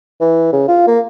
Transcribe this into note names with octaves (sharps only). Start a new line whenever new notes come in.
E3
C#3
F4
A#3